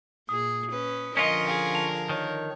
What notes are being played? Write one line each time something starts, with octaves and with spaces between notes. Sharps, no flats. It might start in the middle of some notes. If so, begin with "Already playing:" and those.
A#2 G#4 D#6
C#4 B4
D3 F3 C#4 F4 A#4 D#5
G#4 F5
A5 F7
D#3 C#5